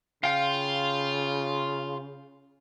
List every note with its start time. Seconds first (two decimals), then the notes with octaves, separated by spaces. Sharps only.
0.24 C#3 F4 F5 G5